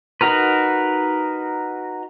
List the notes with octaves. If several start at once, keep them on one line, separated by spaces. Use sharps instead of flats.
D#4 F#4 A#4 B4